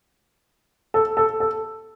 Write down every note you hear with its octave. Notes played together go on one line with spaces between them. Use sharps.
A4
A4
A4